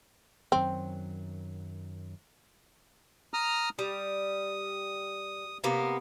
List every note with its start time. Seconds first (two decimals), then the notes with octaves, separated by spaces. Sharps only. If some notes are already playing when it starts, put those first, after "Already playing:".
0.52 F#2 D#3 F#3 C4
3.34 A#5 D#6 F6
3.79 G3 D#6
5.64 C3 A#3 B3